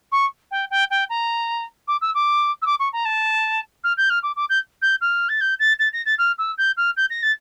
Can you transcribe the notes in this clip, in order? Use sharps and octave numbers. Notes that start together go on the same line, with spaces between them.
C#6
G5
G5
G5
A#5
D6
E6
D6
E6
D6
C#6
A#5
A5
F6
G6
F6
D6
D6
G6
G6
F6
A6
G6
A6
A6
A#6
A6
F6
E6
G6
F6
G6
A#6
A6